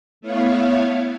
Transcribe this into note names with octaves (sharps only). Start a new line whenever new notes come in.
A3 B3 E4 C#5 F5